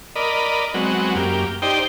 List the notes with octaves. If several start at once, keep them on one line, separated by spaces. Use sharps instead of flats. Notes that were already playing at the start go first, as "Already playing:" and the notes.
A#4 D5 D#5 B5
F#3 G#3 B3 C4 F#4
F#2 A#3 G4
D#4 G4 C5 D5 G5